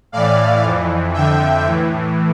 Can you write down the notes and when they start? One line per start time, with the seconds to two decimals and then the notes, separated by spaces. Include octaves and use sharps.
0.12 A2 E3 D5 F5
0.63 F2 E3
1.14 F2 D3 E5 G5
1.65 A2 E3